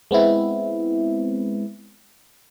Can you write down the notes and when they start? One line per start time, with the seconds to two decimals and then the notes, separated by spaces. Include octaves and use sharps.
0.11 G#3 B3 C4 E4